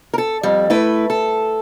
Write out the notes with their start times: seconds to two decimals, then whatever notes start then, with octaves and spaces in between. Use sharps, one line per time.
0.14 A4 A#4
0.43 F2 G3
0.70 A3 E4 B4
1.10 A4